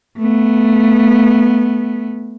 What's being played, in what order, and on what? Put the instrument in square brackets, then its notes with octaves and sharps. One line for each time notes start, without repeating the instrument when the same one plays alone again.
[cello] A3 B3